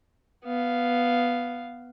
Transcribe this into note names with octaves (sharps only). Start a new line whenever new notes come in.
B3 F5